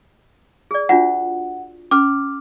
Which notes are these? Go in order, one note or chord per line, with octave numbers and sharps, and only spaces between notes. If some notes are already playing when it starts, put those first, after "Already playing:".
G#4 D5
D4 F4 F#4 F#5
C#4 D6 F6